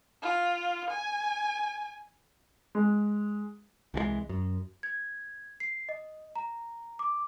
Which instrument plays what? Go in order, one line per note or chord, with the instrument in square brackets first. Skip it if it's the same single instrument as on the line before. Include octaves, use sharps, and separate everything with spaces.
[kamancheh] F4
G#5
[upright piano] G#3
[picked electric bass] C2 E3 F3 G#3
F#2
[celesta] G#6
C7
D#5
A#5
D6